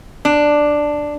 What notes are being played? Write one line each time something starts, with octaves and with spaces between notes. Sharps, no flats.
D4